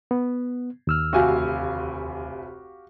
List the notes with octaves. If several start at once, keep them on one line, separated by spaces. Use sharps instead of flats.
B3
D#2 E6 F6
F1 D2 F#4 G4 F5 G#5